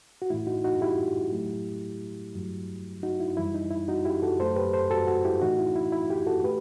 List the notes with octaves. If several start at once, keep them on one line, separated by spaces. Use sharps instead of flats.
F#4
A2 E3 A3 E4
D#4 F#4
D#4 F#4
E4 G4
A2 F#3 A3
G2 F#3 A3
D#4 F#4
E4
F#2 E3 G3 E4
D#4
E4
D#4 F#4
E4 G4
F#4 A4
F#2 F#3 A3 A4 C5
G4 B4
A4 C5
F#4 A4
F#4 A4
E4 G4
A2 E3 A3 D#4 F#4
E4
E4
E4
E4 G4
F#4 A4
A3 G4 B4